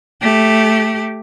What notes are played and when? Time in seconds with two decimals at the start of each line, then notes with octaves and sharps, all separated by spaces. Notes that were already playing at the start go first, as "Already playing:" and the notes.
0.21 A3 G4